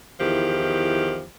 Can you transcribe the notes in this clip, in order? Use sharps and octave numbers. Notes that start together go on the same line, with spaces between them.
E2 D#3 F3 E4 G4